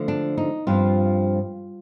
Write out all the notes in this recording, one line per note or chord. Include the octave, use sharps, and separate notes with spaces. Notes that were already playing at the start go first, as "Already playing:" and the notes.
Already playing: D3 F3 A3
D4
D#4
G2 F3 C4 F4